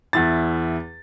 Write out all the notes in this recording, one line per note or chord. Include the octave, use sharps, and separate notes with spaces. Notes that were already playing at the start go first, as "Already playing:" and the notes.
E2 E4 A6